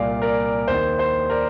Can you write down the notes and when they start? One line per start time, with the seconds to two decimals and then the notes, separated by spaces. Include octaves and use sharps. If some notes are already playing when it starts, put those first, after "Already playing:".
Already playing: C2 A#2 D5 F5
0.22 A#4 D5
0.68 D#2 D#3 C5
0.99 C5
1.30 A#4 D5